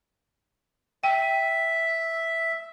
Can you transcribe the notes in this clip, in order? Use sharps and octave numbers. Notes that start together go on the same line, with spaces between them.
E5 G5